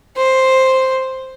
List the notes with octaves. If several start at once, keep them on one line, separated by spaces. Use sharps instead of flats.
C5